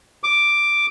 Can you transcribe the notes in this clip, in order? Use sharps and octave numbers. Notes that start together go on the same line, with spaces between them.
D6